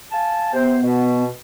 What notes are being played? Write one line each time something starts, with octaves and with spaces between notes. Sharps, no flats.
F5 G#5 A5
C3 B3 C5
B2